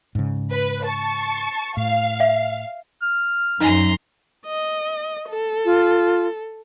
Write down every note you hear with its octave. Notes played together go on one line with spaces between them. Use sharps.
G#2 C#3
B4
A5 C#6
A2 F5
E5
F6
F#2 D#4 D#5 G#5 A#5 C6
D#5
A4
F4